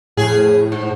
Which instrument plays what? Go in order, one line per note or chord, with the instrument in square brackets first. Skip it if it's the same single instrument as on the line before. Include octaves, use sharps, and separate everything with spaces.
[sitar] F2 G#4 [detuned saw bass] A2
[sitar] G#2